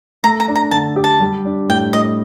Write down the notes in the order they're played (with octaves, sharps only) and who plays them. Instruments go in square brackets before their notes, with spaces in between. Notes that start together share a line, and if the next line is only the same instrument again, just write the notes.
[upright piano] A3 [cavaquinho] A#5
[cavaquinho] A#5
[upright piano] D4
[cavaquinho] A#5
[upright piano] D3 [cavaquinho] A5
[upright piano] G4
[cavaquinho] A5
[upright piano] G3
D4
[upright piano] A2 [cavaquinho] G5
[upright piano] A2 [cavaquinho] D#5